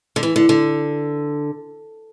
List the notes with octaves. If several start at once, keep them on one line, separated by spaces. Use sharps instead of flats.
D3
E3
D3
D3